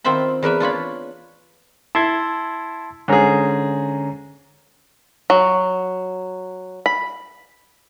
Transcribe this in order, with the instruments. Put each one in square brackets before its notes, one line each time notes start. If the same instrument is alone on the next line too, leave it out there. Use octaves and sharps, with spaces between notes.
[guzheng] D#3 C4 F4 C5 E5 B5
E2 A#4 B4 E5
D4 F4 C#5 B5
[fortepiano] E4 [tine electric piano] A5 C6 G#6
[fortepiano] G#2 G#4 [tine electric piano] D3 C#4 A#5
[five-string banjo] F#3
B5